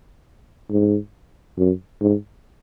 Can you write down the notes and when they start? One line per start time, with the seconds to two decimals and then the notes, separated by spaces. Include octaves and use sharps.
0.71 G#2
1.58 F#2
2.01 G#2